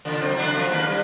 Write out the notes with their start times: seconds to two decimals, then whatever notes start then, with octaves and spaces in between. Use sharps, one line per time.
0.05 A#2 C#3
0.21 F#3 C4
0.36 C#3 D4 E4
0.54 F2 F#3 A3
0.68 D#2 A#3 B4
0.86 G3